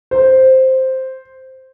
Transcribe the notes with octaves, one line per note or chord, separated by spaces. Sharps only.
C5